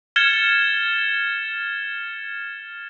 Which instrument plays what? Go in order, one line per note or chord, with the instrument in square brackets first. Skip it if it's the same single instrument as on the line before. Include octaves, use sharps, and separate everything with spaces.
[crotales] F6 G#6 A6 C#7 E7 G7